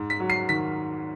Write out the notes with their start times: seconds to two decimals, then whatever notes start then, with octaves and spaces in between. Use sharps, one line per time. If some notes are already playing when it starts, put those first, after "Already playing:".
Already playing: G#2
0.10 B6
0.20 F#3
0.30 C7
0.49 D#3 B6